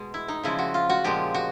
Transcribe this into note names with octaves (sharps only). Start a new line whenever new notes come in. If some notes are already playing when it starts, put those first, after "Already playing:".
Already playing: B2 G#3
E4
D#4
C#3 F3 G#3 E4
F#4
F4
F#4
A#2 F3 G#3 G4
F#4